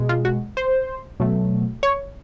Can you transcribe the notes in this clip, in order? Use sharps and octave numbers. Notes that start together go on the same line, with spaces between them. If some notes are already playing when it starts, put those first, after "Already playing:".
Already playing: B2 G#3
F4
F#4
C5
B2 F#3 A3
C#5